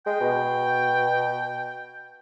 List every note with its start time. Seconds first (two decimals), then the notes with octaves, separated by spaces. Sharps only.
0.06 G#3 G5
0.21 B2